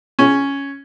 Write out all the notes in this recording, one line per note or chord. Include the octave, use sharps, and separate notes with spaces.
C#4